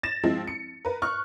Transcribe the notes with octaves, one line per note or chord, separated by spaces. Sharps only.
A6 A#6 E7
F3 G#3 C4 E4
C#7
A#4 B4
C#6 F6 F#6